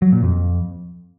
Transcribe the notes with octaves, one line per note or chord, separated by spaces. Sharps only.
F#3
A#2
F2